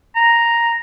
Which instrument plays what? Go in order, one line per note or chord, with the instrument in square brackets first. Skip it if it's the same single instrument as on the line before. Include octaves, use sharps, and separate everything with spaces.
[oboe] A#5